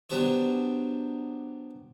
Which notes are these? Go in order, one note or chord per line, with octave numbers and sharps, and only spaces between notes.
F#3 B3 D4 G4 C5 C#5